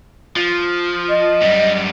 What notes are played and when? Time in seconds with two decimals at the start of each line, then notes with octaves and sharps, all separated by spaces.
0.36 F3
1.09 D#5
1.41 F#2 G3